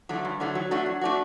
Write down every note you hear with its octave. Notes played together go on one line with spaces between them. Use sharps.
D3 F#3 A3
G2
D3 F#3 A3
F#3
A3 D4 F#4
F#3
A3 D4 F#4